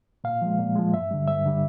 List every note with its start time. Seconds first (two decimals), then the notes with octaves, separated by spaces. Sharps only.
0.24 A#2 F5
0.42 F3 G#3
0.59 A#2
0.76 F3 G#3
0.93 G2 E5
1.11 D3 G3
1.28 G2 E5
1.46 D3 G3